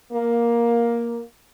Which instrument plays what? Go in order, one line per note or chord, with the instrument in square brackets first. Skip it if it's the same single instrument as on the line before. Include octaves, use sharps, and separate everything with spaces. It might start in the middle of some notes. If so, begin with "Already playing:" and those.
[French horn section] A#3